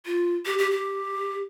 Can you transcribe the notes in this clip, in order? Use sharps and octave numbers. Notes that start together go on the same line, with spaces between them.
F4
G4
G4
G4